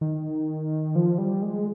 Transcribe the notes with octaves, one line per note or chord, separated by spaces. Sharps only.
D#3
F3
G3
G#3